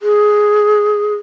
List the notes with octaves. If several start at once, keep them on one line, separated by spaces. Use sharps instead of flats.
G#4